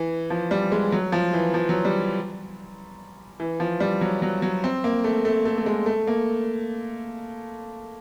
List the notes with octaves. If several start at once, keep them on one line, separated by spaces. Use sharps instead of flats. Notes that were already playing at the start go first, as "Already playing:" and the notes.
Already playing: E3
F3
G3
G#3
F#3
F3
E3
F3
F#3
G3
E3
F3
G3
F#3
F#3
F#3
C4
A#3
A3
A3
A3
A3
G#3
A3
A#3